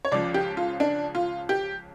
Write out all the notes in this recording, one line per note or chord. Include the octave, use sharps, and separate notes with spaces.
C#5
C#2 C#3 F3 D5
G4
F4
D4
F4
G4